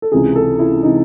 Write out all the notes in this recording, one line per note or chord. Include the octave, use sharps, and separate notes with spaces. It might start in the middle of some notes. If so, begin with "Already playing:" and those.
A4
C#2 C3 E3 G#4
A4
E4
C3 E3 D#4